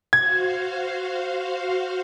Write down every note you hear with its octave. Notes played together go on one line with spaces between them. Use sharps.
F#4 C5 F5 G#6